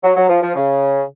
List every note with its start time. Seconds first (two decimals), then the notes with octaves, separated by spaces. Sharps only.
0.04 F#3
0.17 F#3
0.29 F3
0.43 F3
0.56 C#3